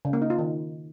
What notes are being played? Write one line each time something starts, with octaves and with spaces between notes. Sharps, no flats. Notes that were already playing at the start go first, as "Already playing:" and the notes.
C#3
A#3
D#4
F4
D#3